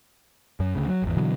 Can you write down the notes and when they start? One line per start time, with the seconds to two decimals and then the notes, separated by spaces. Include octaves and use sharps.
0.60 F#2
0.75 D2 C#3
0.88 F#3
1.02 G#1 E2
1.17 B2 D3 E3 F#3